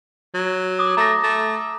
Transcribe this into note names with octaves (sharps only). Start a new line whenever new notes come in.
F#3
D6 D#6
A3 A#5 D6 A#6
A3